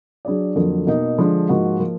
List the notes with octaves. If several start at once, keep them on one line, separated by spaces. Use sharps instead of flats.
F#3 D4 G#4 D5
F2 D3 F#3 A#3
B2 A#3 D#4
D3 F3 G#3 D4
G#2 F3 A#3 D#4 F#4
F3 A#3 F4